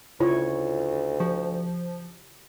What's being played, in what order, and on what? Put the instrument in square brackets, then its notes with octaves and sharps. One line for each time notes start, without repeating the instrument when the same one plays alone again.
[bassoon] D2 [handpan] C#3 E4 C#5 [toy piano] F4
[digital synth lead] F3 [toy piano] G4